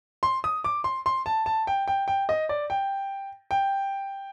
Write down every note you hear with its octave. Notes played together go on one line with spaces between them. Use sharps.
C6
D#6
D6
C6
C6
A5
A5
G5
G5
G5
D#5
D5
G5
G5